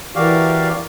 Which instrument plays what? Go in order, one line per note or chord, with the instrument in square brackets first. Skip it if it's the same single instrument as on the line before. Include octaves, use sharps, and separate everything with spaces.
[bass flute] E3 [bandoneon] F#4 G4 F5 [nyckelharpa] A#4 [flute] D5